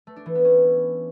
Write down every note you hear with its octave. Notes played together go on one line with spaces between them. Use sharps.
A3
D4
E3
B3
C#4